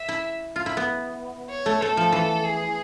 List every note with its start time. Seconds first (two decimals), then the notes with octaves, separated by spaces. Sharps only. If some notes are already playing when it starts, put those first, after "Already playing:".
Already playing: E5
0.09 E4
0.56 F4
0.66 E4
0.77 B3
1.50 C#5
1.66 A3
1.81 A3 A4
1.97 F3
2.12 E3
2.44 G#4